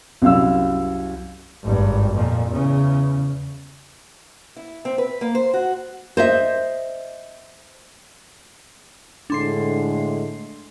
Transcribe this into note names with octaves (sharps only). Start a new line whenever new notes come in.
C2 F#2 F5 E6
G#1 G2
F2 A#2
E2 C#3
E4
C4
B4
A#3
C5
F#4
C5 D#5 E5
A2 D3 G#3 D4 C6 C7